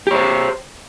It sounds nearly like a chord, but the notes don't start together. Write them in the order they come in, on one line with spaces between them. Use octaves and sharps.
G4 C#5 C5